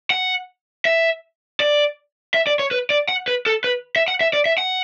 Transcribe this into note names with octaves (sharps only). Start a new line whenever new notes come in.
F#5
E5
D5
E5
D5
C#5
B4
D5
F#5
B4
A4
B4
E5
F#5
E5
D5
E5
F#5